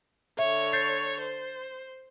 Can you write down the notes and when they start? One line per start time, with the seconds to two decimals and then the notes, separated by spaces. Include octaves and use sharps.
0.39 D3 C#5 E5
0.73 G6 A6 C7
1.21 C5